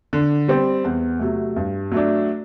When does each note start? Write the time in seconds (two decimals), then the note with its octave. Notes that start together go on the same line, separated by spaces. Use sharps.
0.13 D3
0.48 G3 C4
0.84 E2
1.19 C3 F#3 A3
1.56 G2
1.92 F#3 A3 D4